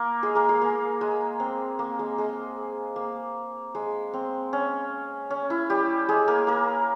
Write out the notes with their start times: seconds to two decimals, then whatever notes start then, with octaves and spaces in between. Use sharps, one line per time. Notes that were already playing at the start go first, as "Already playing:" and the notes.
Already playing: A#3 A#4
0.23 G#3 G#4
0.35 A#3 A#4
0.49 G#3 G#4
0.62 A#3
1.01 G#3
1.40 C4
1.79 A#3
1.99 G#3
2.18 G#3
2.96 A#3
3.75 G#3
4.14 C4
4.53 C#4
5.30 C#4
5.50 E4
5.70 G3 G4
6.09 G#3 G#4
6.28 A#3 A#4
6.47 A#3 A#4